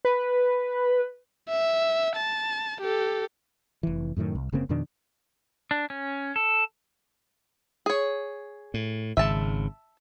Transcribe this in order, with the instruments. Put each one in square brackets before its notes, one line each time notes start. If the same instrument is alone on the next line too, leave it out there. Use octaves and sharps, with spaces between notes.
[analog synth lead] B4
[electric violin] E5
A5
G4 A4
[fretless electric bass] F1 E3
F#2 A2 D3 D#3
C2
F#1 C#3 A#3 C4
F2 B2 D#3 D4
[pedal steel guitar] D4
C#4
A4
[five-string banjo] G#4 C#5
[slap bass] A2
[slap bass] G#1 C#3 [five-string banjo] E5 A5